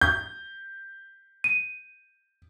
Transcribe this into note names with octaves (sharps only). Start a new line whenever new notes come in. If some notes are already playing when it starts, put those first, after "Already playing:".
G6
D#7